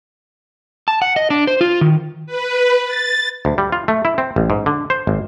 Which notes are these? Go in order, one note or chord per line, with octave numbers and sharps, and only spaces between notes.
A5
F#5
D#5
D4
C5
F4
D#3
B4
A6
D2
G3
F4
A3
E4
C4
A1
G#2
D3
C5
G#1